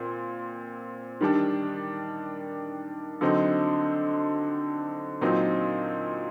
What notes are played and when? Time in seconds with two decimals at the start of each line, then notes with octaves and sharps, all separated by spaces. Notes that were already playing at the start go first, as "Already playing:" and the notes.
Already playing: A#2 C4
1.21 D#3 G3 D4
3.21 D3 F#3 C4 D#4
5.21 A#2 F#3 C4 D#4